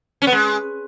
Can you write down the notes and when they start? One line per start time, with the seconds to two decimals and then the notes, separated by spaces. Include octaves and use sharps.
0.22 C#4
0.27 B3
0.32 G#3